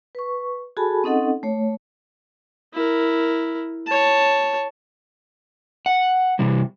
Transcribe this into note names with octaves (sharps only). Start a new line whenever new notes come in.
B4 C#6
F#4 G#4 A4 G#5 A5 B5
C4 C#4 D#4 A4 D#5 F#5
A3 C#5
E4 A#4
C#5 A5
F#5
C3 E3 G3